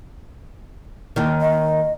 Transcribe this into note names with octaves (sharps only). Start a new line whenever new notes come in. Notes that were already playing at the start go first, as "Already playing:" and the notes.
D#2 D#3
D#5